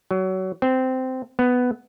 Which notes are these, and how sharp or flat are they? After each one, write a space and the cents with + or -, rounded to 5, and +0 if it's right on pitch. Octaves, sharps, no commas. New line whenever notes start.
F#3 +25
C4 -15
B3 +5